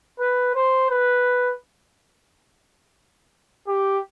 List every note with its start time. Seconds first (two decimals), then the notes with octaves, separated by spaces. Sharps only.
0.19 B4
0.55 C5
0.90 B4
3.67 G4